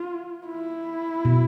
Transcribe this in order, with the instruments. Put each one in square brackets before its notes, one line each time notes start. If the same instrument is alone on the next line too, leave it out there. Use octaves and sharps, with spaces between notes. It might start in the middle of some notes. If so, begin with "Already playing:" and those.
Already playing: [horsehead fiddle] F4
E4
[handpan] B2